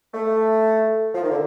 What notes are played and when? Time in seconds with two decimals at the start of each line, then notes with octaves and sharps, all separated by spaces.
0.14 A3
1.15 F3
1.23 D#3
1.30 D3